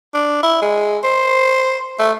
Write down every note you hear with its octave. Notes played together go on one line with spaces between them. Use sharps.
D4
E4
G#3
C5
A3